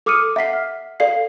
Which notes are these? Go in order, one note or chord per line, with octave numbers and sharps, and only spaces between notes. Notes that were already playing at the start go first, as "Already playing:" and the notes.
A4 D6 D#6 F6 C#7 D#7
E5 F#5 B6 C7
F6
A4 D5 F5 C7